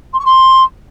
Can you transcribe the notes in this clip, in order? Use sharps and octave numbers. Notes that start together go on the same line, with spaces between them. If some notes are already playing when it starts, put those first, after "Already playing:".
C6
C#6
C6